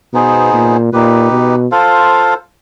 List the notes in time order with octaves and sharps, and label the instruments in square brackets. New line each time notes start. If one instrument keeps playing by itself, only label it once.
[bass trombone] B2 [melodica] B3 D#4 G#4 C5
[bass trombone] A#2
[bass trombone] A#2 [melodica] D#4 G4 B4
[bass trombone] B2
[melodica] F4 A4 C5 F5